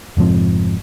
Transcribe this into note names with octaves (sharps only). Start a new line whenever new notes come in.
F1 G#2 F3 C4